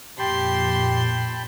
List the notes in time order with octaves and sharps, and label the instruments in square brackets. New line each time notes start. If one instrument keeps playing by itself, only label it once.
[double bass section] F2 A#2 [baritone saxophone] G4 [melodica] G5 A5 B5 [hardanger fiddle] C6